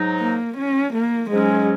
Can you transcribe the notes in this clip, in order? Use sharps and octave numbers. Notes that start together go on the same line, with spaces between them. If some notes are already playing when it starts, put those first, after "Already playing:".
Already playing: G#2 F#3 D#4
A#3
C#4
A#3
G#2 F#3 G#3 C#4